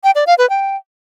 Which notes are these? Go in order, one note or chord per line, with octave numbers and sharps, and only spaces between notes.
G5
D5
F5
B4
G5